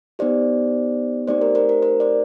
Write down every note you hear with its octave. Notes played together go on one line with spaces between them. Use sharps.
B3 D#4 G4 C5 D5
A3 C4 D#4 G4 C5 D5
A#4 C5
A#4 C5
A#4
A#4 C5
C5 D5